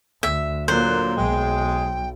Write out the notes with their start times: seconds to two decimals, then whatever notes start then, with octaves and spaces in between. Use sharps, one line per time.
0.23 D2 E5
0.68 A#2 D3 F#3 A#3 C5 F#6
1.17 B1 G#3 G5